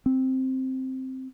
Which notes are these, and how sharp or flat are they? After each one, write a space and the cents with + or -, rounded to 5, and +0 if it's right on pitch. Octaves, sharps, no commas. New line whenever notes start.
C4 +0